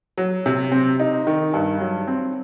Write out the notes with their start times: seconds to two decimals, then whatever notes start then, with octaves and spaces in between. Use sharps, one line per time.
0.18 F#3
0.46 C3
0.72 C4
1.00 D#4
1.27 D#3
1.54 G2
1.80 F#3
2.07 C4